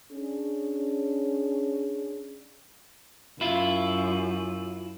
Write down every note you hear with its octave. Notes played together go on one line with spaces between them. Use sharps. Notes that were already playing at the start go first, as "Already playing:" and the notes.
C#4 D4 G#4
F#2 E4 F4